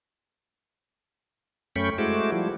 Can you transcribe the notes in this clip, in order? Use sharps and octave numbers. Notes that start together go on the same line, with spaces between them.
F#2 A3 C#4 G5 B5 C#6
G#3 A3 E4 F#4 C5 D6
F3 G3